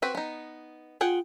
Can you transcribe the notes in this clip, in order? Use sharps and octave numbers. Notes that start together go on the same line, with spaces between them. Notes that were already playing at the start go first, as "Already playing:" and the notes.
C4 F#4 B4
B3 D#4
F4 G#4 F#5 G5